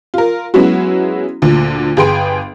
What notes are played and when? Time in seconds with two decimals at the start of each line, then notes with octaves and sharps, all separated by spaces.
0.14 F4 A#4
0.54 F#3 G#3 B3 C#4 E4 F#4
1.42 D2 A#2 D3
1.97 G1 G#4 B4 G5 C6 D7